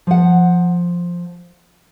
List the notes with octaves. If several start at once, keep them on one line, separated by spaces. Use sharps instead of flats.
F3 F#5